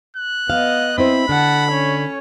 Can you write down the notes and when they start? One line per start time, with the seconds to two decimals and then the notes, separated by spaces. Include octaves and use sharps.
0.17 F#6
0.50 B3 D#5 F5
0.98 C4 E4 C5 B5
1.29 D3 F#5 A5
1.70 C#4 C#5